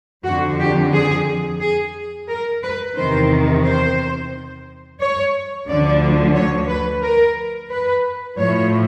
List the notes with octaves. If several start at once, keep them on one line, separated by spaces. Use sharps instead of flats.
F2 D3 F3 F#4
G4
G#4
G#4
A#4
B4
E2 C3 D#3 C5
C5
C#5
D2 D3 F3 D5
C#5
B4
A#4
B4
A2 F3 C#5